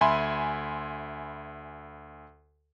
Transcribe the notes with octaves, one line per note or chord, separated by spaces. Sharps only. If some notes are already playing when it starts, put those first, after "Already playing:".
D2 E5 G#5 B5 C6